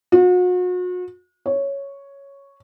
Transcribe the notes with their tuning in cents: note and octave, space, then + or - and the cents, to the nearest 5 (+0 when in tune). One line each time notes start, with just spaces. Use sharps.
F#4 -40
C#5 +0